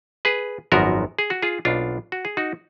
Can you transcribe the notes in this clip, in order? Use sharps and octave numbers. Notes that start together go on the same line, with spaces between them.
G#4 B4
G#1 F#2 F3 B3 F#4 A#4
G#4
F#4
F4 G#4
B1 B2 A#3 D4 F4
F#4
G#4
D#4 F#4